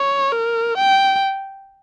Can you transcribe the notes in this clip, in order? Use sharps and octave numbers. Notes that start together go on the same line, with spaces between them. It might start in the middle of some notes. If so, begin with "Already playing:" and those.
Already playing: C#5
A#4
G5